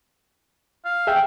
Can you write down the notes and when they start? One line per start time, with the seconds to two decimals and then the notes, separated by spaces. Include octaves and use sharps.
0.85 F5
1.07 G#4 E5 G5